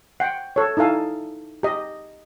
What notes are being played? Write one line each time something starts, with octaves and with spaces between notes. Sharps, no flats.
F#5 G5
A4 C#5
D#4 E4 A4 F5 G#5
G4 D#5